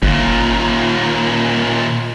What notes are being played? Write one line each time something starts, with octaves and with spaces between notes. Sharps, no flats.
G1 D#2 A#2